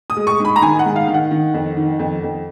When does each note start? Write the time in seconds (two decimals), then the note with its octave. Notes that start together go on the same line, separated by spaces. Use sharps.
0.10 D#6
0.17 G#3
0.27 C#6
0.39 G#2
0.45 B5
0.56 A#5
0.61 D#3 G#5
0.79 F#5
0.85 G#2
0.96 F5
1.08 D#3
1.14 F#5
1.31 D#3
1.54 F2
1.77 D#3
1.99 F2
2.23 F2